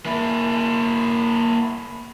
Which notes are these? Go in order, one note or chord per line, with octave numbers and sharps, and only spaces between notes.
A#3 E4